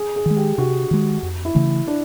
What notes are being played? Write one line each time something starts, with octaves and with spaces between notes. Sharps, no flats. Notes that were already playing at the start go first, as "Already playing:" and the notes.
Already playing: G#4
G#4
D#3 G#3
G4
C3 F#4
D#3 G#3
F2
E4
C#3 E3 A3
D4